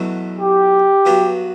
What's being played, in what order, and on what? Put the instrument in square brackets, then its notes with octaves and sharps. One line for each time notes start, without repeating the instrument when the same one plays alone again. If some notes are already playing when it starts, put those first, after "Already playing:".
Already playing: [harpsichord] E2 B2 F#3 A3 E4
[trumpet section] G4
[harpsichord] G2 F#3 B3